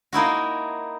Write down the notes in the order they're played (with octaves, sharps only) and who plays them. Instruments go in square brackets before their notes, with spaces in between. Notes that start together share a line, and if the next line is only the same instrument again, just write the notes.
[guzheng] A#3 D#4 E4 F#4